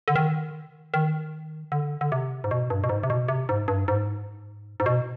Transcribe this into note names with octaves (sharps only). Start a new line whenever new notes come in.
D3
D#3
D#3
D3
D3
C3
G#2
B2
G2
B2
G#2
C3
B2
C3
G#2
G2
G#2
G#2
B2